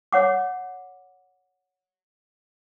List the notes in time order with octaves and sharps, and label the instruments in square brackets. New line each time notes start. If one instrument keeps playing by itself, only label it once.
[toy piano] C#5 F#5 D6